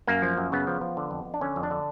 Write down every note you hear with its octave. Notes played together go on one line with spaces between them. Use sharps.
F#2 A#3
F3
F#2
C#3 B3
F3
F3
D3
F2
F2
D4
D3 C#4
F2
D4
D3